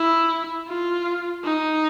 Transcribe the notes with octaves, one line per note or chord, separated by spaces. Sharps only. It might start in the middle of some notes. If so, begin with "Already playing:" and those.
Already playing: E4
F4
D#4